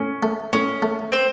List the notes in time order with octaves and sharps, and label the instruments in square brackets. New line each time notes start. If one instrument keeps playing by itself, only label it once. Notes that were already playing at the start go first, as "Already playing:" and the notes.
Already playing: [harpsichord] A2 [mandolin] C#4
[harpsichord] A3
[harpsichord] A2 [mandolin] C#4
[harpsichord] A3
[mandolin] C4 C5